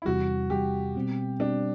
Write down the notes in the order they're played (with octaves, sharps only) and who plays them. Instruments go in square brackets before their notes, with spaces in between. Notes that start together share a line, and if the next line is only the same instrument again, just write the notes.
[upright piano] E4
[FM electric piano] E2 C3 G3 [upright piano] F#4
[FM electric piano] E2 C3 G3 [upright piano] G4
[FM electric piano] B2 G3 C4
[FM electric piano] B2 G3 C4 [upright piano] D4